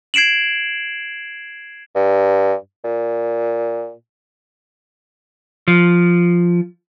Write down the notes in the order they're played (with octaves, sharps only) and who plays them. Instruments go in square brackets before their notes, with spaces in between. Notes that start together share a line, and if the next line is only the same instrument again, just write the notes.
[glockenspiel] G#6 C7 D7 E7 F#7
[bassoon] G2
A#2
[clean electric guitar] F3